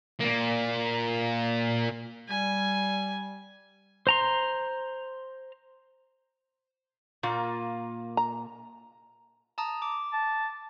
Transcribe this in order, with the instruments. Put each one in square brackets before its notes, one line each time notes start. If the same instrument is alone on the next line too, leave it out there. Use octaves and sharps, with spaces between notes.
[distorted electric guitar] A#2 A#3
[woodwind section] G3 [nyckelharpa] G#5
[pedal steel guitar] C5 A#5 C6
[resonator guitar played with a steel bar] A#2 A#3 F4
[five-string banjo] A#5
[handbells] A5 A#5 D#6
D6
[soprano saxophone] A5